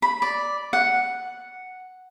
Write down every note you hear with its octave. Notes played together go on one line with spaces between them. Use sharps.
B5
D5
F#5